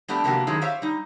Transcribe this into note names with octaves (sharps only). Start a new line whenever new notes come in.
G3 A3 B3 D4 G4
C3 F3 A#3 B3 F#4 G4
F#2 D#3 G#3 C#4 E4
G4 C5 C#5 E5 F5
G3 D#4